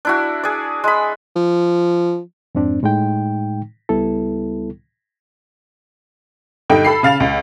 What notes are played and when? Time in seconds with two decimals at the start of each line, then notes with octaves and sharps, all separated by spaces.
0.05 D4 E4 F#4
0.43 G#4 D5
0.84 G#3 B5
1.36 F3
2.55 F2 G#2 C4 D4
2.83 A2 G#3 D#4 G5
3.89 C#2 G3 B3 E4 A4
6.70 G2 D3 D#4 G5
6.85 A4 B5 C7
7.03 C#3 F5 A6 F7
7.20 C#2